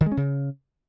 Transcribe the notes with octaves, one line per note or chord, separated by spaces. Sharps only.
D#3
G#3
C#4
C#3